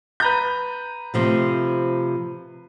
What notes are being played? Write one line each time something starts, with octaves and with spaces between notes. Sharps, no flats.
B4 A#5 G6
C3 F3 A3